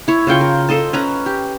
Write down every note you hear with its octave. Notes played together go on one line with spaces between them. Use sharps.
E4 C#5
C#3 F4 G5 C#6
A#4
A4 C5 D#5 A5
C#4 B4 A#5
G4